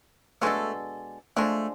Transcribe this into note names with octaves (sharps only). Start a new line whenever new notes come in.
B2 G#3 A3 D4 A4
F3 G#3 A3 D4